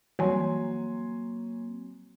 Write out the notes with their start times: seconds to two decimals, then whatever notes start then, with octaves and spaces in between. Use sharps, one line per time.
0.19 E3 F#3 G3 A#3 C4 C#5 G#5 C6